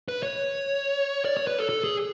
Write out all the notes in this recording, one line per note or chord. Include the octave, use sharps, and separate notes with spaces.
B4
C#5
D5
C#5
B4
A4
A4
G#4